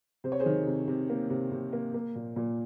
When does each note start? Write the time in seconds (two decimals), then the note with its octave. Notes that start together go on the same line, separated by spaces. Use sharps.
0.24 C3 C5
0.32 C#5
0.40 G#4 C5
0.46 D#3
0.67 C3
0.88 C3
1.09 A#3
1.30 C3
1.51 C3
1.73 A#3
1.94 A#3
2.15 A#2
2.36 A#2